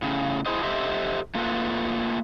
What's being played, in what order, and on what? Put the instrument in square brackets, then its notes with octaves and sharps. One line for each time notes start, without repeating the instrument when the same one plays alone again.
[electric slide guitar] A2 C#3
E4 G#4 C5 D#5
G4 A4 C5 D#5 E5
A3 A#3 F4 A4 B4